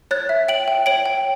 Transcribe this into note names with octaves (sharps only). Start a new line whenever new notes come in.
C#5 F#6 A6
E5
G5 D7 F#7
G5
C#5 D7 F#7
G5